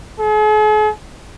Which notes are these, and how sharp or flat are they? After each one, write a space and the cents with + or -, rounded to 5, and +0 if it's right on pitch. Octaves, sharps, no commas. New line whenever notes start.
G#4 +45